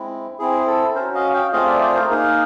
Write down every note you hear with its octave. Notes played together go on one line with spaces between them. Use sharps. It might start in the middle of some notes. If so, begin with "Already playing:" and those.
Already playing: G#3 C4 E4
C4 E4 G#4
A4
C#4 F#4 A#4 C5
D#5 F5
F5 G5
A3 C4 F4 G#4 D#5 F5
D5 E5
C5 D5
A#4 C5
A#3 D#4 G#4 A#4